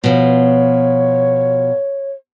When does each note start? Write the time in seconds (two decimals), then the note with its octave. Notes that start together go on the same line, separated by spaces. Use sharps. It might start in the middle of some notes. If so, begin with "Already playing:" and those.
0.04 B2 F3 C#5